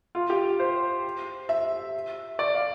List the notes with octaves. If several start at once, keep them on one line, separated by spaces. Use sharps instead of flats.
F4
G4
C5
E5
D5
F5